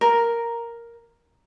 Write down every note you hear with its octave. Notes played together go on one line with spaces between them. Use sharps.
A#4